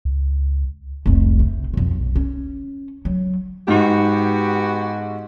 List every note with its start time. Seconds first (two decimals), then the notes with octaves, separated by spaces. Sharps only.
0.05 C#2
1.06 F1 C2
1.39 C3
1.73 B1 F2
1.95 B1
2.16 C#4
3.05 F#3
3.68 G#2 B3 F#4 G4